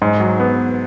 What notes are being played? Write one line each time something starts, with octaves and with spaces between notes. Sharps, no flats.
G#2
F#3
B3